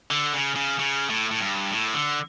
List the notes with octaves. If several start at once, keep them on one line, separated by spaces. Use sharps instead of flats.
D3
C#3
C#3
C#3
A2
A2
G2
A2
D3